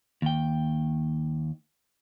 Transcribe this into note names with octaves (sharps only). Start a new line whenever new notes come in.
D#2 G5